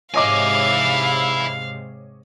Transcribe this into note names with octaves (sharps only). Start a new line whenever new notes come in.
G#2 C3 E4 C#5 D#5 F5 G#5 D6